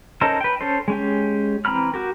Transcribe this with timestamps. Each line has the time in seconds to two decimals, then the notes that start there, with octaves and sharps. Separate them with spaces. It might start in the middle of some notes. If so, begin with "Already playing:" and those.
0.21 C#4 D#4 A4 A#4 C5
0.41 B4 G5
0.61 C#4 A4 C5
0.88 G#3 C#4 G4
1.65 E3 C4 A#5 B5 F6
1.94 F#4 G4 A#4